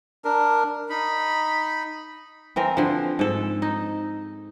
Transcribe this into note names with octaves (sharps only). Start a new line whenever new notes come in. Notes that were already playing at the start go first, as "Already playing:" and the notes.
D4 A#4
D#4 B5
E3 C4 A#4
D3 F3
G#2 A4
D#4